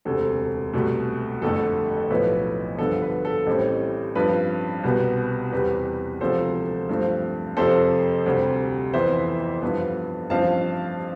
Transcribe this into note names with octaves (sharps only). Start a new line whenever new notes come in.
E1 D2 C3 A4
C2 B2 A3
G1 F2 D3 A3 A4
B1 A2 F3 B3 B4
G2 D3 F3 B3 A4
B4
A4
A1 A2 G3 C4
G2 F3 C4 B4
C2 B2 G3 B3
E2 C3 G3 B4
E1 D2 C3 F3 A4 C5
G2 F3 A3 C4
F2 C3 F3 C4 A4 C5
D2 C3 G3 C4
F2 E3 B3 C5 E5
G2 F3 B3
A1 G2 F3 C4 F5 A5